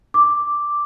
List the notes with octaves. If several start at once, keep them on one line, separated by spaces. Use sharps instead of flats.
D6